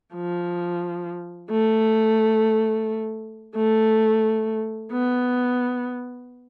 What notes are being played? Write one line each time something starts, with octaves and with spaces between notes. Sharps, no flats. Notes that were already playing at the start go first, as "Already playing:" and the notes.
F3
A3
A3
B3